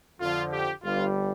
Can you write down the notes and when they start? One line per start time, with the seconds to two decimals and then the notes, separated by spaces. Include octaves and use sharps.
0.20 F2 D3 F3 F4
0.51 G4
0.83 G1 G2 G3 F4